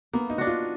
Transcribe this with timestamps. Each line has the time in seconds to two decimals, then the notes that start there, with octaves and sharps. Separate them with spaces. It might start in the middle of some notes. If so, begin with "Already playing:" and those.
0.13 A#3 B3
0.30 D#4
0.38 D4 F#4
0.47 F4